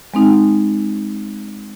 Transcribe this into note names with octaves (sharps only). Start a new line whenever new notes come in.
G#3 C4 D#4